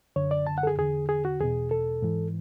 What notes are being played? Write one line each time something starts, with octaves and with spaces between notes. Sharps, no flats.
F#2 D3 C#5
D5
A5
F#5
A4
G#4
E2 D3 G#4
G#4
F#4
E2 B2 G#4
A4
G#2 E3